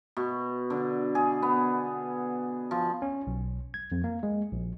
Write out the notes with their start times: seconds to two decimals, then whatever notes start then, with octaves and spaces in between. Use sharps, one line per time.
0.17 B2
0.70 D3
1.15 G#4
1.42 B3
2.71 F3
3.02 C#4
3.27 B1
3.74 G#6
3.92 F2
4.04 A#3
4.23 G#3
4.52 A#1